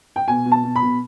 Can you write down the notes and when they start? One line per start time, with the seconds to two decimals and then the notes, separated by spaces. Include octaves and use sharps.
0.16 G5
0.28 B2 G#5
0.46 B2
0.52 A5
0.63 B2
0.76 B5
0.82 B2